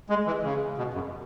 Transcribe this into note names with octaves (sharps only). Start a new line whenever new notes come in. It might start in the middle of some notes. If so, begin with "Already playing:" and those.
G#3
E3
C#3
B2
F#2